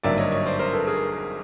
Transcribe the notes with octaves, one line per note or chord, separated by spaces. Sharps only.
G#1 G2 D3 F#3 A#3 D5 E5
C#5 D#5
C#5 D#5
C5 D5
A#4 C5
A4 B4
G#4 A#4